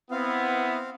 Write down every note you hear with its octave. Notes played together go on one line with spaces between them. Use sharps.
B3 C4 E4 F5